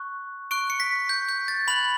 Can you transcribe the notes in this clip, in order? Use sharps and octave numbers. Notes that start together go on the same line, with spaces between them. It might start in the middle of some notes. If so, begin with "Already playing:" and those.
Already playing: C#6 F#6
C#6 F#6 D7
C#7
B6
G6
G6
A6
B5 F#6 F#7